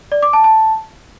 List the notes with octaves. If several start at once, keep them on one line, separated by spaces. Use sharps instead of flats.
D5
D6
A5
A5